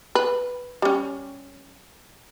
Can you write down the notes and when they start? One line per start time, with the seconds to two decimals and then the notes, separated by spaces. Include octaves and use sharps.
0.15 B4
0.82 G3 C#4